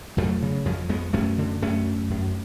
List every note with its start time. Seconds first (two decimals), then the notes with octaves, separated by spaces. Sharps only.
0.17 F2 F#3 A3
0.42 C#3
0.65 F2 F3 G#3
0.89 F2 G#3 B3
1.13 F#2 A3 C#4
1.38 D3
1.62 F#2 A3 C#4
1.87 F#2
2.10 F#2